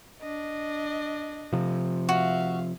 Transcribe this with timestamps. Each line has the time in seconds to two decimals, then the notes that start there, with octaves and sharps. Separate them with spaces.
0.21 D4 D#5
1.53 C3 F3
2.09 F#4 E5 F5